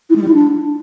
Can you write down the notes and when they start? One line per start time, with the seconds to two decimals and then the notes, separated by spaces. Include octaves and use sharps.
0.09 E4
0.16 G#3
0.22 G3
0.28 E4
0.34 D4